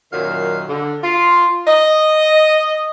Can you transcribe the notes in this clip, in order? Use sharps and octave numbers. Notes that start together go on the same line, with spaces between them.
F#2 A#2 D#3 F#3 F5
D3
F4
D#5